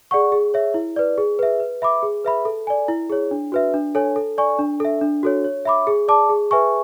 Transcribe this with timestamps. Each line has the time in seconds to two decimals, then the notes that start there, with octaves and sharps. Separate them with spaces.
0.11 G#4 D5 F#5 C#6
0.32 G#4
0.54 C#5 E5
0.74 E4
0.96 B4 D5
1.18 G#4
1.39 B4 E5
1.60 B4
1.82 E5 B5 D6
2.03 G#4
2.25 B4 E5 B5
2.45 A4
2.67 D5 G#5
2.88 E4
3.09 G#4 C#5
3.31 D4
3.52 F#4 B4 E5
3.74 D4
3.95 A4 C#5 G#5
4.16 A4
4.38 D5 G#5 C#6
4.59 D4
4.80 A4 E5
5.01 D4
5.23 F#4 A4 C#5
5.44 C#5
5.66 E5 B5 D6
5.87 G#4
6.08 D5 A5 D6
6.30 G#4
6.51 B4 E5 G#5 C#6